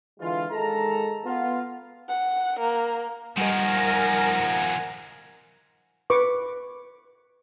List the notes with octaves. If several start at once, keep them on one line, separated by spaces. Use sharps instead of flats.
D3 E3 G#3 F4
D#3 G#3 A4 A5 A#5
B3 F4
F#5
A#3
D#3 F3 G3 G4 A#4 D#5 F#5 G#5
B4 C#6 D6